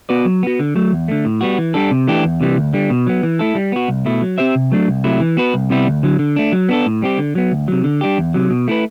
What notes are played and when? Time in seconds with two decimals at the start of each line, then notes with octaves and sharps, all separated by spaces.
0.09 B3 F#4 B4 D5
0.25 F#3
0.43 B3 F#4
0.59 D3
0.76 F#3 A3
0.92 E2
1.08 D3 A3
1.25 A2
1.41 G3 B3 F#4
1.58 E3
1.74 G3 D4 A4
1.91 C3
2.07 E3 A3 D4 G4
2.24 E2
2.41 C3 E3 G3
2.57 D2
2.73 D3 G3
2.90 B2
3.07 F#3 B3
3.23 E3
3.39 A3 E4 A4
3.55 G3
3.72 B3 F#4
3.88 C2
4.06 B2 A3 E4
4.22 F#3
4.38 C4 G4 C5 E5
4.55 C3
4.72 F#3 A3 D4
4.88 C2
5.04 C3 F#3 A3 E4
5.20 E3
5.37 B3 F#4 B4
5.54 C2
5.70 C3 G3 B3 E4
5.87 D2
6.03 D3 F#3
6.19 D3
6.36 A3 D4
6.52 F#3
6.69 B3 D4 A4
6.86 A2
7.02 G3 C4 G4
7.18 D3
7.35 F#3 B3
7.52 D2
7.68 C3 F#3
7.84 D3
8.01 G3 D4 G4
8.18 E2
8.34 C3 F#3
8.50 B2
8.68 A3 E4 B4